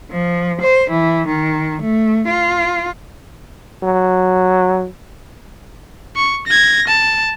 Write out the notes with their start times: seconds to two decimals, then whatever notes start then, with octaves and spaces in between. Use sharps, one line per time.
0.11 F3
0.61 C5
0.91 E3
1.27 D#3
1.82 A3
2.28 F4
3.84 F#3
6.16 C#6
6.47 G#6 A#6
6.87 A5